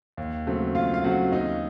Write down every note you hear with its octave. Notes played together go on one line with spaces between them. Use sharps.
D#2
C#3 F#3 A3 C4
D#2 F4 F5
F5
C#3 F#3 A3 C4 F#4 F#5
D#2 D#4 D#5